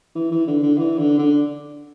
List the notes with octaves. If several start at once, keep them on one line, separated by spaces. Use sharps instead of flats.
E3
E3
D3
D3
E3
D3
D3